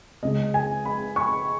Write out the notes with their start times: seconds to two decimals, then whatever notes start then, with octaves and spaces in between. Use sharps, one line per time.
0.23 C#2 C#3 G#3 D#5
0.54 G#5
0.85 B5
1.16 C#6